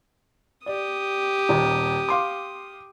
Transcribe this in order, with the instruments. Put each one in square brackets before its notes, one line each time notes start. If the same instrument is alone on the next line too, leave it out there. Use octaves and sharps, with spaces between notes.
[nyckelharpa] G4 D#6 [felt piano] D5
[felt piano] D#1 D#2
F5 C6 D6